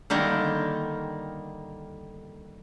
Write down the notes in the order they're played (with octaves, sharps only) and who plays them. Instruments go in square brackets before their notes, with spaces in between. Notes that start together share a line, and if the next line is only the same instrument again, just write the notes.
[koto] D3 D#3 G3 A#3